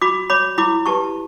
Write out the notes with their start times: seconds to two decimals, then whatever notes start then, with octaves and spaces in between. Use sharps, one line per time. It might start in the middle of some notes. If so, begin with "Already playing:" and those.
0.02 F#4 B5 D6
0.30 C#5 B5 D6
0.58 E4 B5 D6
0.86 G4 B4 A5 C#6